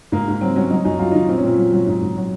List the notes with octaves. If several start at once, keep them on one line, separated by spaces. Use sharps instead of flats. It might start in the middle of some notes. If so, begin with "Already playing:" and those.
G#2 A#3
G#2
F#3 C4
F#3 C#4
F#3 D#4
F#2 D#4
F#2 F4
D#3 D#4
A#2 C4
C#4
A#2 C4
F#3
F#3
G#2
G#2
F#3